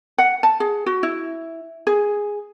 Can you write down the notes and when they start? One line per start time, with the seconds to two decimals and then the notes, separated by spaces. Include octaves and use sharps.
0.18 F#5
0.43 A5
0.60 G#4
0.86 F#4
1.03 E4
1.87 G#4